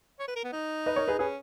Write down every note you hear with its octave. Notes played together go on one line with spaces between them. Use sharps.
C#5
B4
A#4
B3
D#4
B4 D#5
A#4 C#5
G#4 B4
C#4 G#4 B4